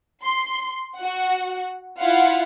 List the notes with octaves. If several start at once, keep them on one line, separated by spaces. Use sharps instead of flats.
C6
F#4 F#5
E4 F4 F5 F#5